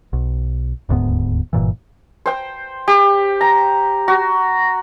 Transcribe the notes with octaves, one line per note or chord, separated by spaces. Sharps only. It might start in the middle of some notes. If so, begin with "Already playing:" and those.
B1
D#1 D2 G#2 B3
F#1 G2 A#2 E3
C5 G5
G4
A#5
F#4